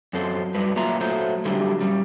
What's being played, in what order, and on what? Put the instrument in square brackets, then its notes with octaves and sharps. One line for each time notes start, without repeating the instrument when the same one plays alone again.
[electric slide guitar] F#2 F#3 C4 A4 C5
F#3 G3 B4
F#3 A#3 F4 F#4 E5 A#5
F#3 A3 C5
D3 F#3 G3 D4 E4 G4
G3 C#4